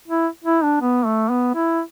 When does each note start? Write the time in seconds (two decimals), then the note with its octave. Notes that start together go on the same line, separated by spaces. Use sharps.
0.08 E4
0.44 E4
0.63 D4
0.81 B3
1.06 A3
1.30 B3
1.55 E4